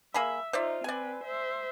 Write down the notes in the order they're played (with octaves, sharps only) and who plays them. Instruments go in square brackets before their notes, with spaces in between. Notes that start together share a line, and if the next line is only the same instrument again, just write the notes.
[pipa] A#3 G#4 B5 [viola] E5
[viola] D#4 F4 [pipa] C5 D5 E5
[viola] C4 B4 [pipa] D5 G#5
[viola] C5 E5